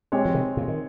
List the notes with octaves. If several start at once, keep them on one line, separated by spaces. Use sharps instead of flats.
G#3 C4 G4 C#5
F3
C3 D#3
A#2 C#3
D#3